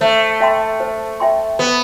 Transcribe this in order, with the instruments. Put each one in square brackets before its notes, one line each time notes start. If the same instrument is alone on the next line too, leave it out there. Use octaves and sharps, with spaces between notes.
[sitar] A3 [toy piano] C5
[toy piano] E5 G5 C6
C5
E5 G5 C6
[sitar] B3 [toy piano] C5